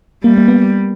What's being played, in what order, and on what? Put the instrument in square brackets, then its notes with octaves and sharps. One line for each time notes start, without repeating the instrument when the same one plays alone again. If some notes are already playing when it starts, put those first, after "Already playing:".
[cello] G3 [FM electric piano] A#3
[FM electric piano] A#3
B3